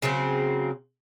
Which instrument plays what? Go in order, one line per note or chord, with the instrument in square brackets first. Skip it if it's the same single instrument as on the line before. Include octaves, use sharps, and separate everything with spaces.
[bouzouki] C#3 F#3 A#3 C4